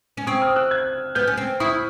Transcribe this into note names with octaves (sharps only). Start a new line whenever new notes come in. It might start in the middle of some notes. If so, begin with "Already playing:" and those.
C#4
C4 C#6 D#6
D#6 F6
E6 F#6
F#6 G#6
B3 F6 G6
C#4
C4
E4 C#6 D#6